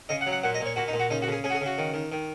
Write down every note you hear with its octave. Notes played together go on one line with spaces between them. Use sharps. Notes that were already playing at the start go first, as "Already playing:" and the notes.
C#3 D#5
F#5
F#3
F#5
A#2 F#5
D#5
A#2
C#5
A#2 F#4
D#4
A#2
F#4
C#3 D#4
F#4
C#3 G#4
C#4 G#4
F#4
G#4
C#3 F#4
D#3
D#3
D#3